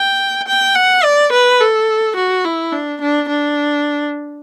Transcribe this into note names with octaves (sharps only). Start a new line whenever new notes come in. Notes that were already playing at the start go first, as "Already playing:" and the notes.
Already playing: G5
G5
F#5
D5
B4
A4
F#4
E4
D4
D4
D4